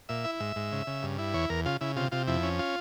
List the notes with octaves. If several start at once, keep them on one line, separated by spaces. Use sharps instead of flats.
A#2 E5
E4
G#2 E5
G#2
C#3
C#3
G2
E4
E2 C#5
E2 A#4
C#3 F4
C#3 E4
C3 F4
C3 F4
F2 E4
C#4
F4